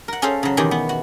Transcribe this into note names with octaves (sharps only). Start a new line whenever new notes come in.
A#4 F#5
C#4 G#4 A4 C5 F5
C#3 F#3
E2 B2 D#3 G4 G#4 G#5
B3
F#4